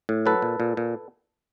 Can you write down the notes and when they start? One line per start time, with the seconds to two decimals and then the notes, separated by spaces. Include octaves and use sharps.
0.09 A2
0.26 F#3 A4 B4
0.42 A#2
0.60 A#2
0.77 A#2